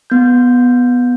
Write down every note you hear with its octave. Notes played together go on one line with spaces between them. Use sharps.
B3 G6